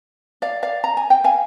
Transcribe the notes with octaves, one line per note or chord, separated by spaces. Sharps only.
D5 F5
D5 F5
A#5
G#5
G5
F5 G#5